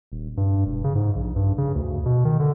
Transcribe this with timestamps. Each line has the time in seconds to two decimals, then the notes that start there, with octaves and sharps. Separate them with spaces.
0.12 D#1
0.37 G2
0.66 E1
0.84 C#3
0.95 G#2
1.15 A#1
1.36 G2
1.58 C#3
1.75 D2
2.06 B2
2.25 D#3
2.40 D3